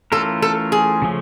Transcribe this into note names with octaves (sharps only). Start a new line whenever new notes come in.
E3 A3 C#4 F4 A4 A#4
A4
G#4
C#3 F3 A3 C#4